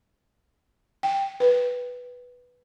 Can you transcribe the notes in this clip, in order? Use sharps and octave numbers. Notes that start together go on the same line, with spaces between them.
G5
B4